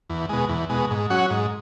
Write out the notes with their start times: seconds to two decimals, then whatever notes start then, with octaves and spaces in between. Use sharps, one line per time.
0.10 E2
0.29 B2 G#3
0.49 E2
0.70 B2 G#3
0.90 G#2
1.10 F#3 C#4 F#4
1.30 G#2